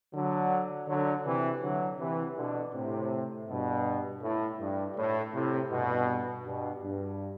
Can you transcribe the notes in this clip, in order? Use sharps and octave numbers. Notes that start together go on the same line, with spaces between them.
D3 F#3
D3 F#3
C3 E3
D3 F#3
C3 E3
B2 D3
A2 C3
G2 B2
A2
G2
A2
A2 C3
G2 B2
G2 B2
G2